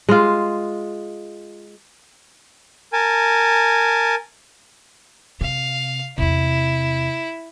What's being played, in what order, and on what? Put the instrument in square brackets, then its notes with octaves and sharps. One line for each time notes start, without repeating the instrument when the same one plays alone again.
[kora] G#3 F4
[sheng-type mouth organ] A#4 G#5 A5
[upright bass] C3 [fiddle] F5
[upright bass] E2 C3 [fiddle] E4